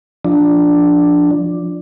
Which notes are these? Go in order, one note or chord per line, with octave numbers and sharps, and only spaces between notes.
F3 D4